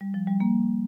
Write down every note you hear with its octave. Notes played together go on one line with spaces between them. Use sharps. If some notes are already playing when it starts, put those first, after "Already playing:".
G3
F3
G3
A#3